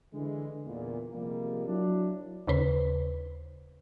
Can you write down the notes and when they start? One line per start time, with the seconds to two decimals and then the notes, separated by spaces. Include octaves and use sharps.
0.13 D3 E3 G#3
0.65 E2 A#2
1.13 C3 F3 G3 G#3 A#3
1.66 F#3 D4 E4
2.47 D#2 C#3 B4 C5